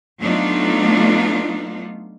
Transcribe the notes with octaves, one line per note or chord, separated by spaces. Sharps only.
F#3 A3 B3 D4 D#4 F4